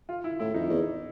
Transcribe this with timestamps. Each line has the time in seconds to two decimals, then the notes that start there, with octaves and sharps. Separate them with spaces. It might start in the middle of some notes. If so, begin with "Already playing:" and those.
0.09 F4
0.24 E4
0.40 A2 E4
0.54 F2 D#4
0.70 E2